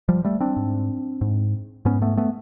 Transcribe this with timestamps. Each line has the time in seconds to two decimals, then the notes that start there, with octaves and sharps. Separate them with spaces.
0.09 F3 G3
0.24 G3 A3
0.40 C4 D4
0.57 G#2
1.21 G#2
1.85 G#2 B3 C#4
2.02 A3 B3
2.17 A3 B3